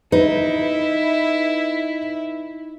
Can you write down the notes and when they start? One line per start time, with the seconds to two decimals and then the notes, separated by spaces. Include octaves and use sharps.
0.12 D#4 E4 B4